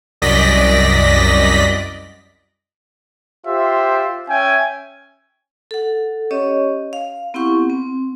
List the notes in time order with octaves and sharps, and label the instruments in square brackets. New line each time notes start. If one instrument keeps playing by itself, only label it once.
[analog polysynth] C2 F#2 D5 D#5 A#6 B6
[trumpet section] F4 G4 C5 E5
C#4 E5 G5 G#5
[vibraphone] A4 F#5
C#4 G4 C#5 D#5 C#6
F5
B3 C4 E4 G4 F#5 C#6
C4